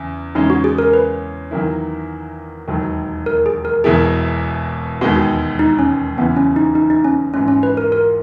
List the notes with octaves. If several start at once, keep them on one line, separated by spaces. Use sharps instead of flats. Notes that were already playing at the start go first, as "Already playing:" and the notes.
Already playing: E2 C#3
E2 C#3 G#3 C#4 D#4
F#4
G#4
A#4
B4
E2 D#3 F#3 A#3 E4
E1 D#2 D#3 F#3
A#4
G#4
A#4
E1 E2 B2 A#3 E4 G#4
E1 D#2 D#3 G#3 B3 F#4
D#4
C#4
F#1 E2 C#3 E3 B3
C#4
D#4
D#4
D#4
C#4
A#1 G#2 E3 C#4
C#4
B4
A#4
A#4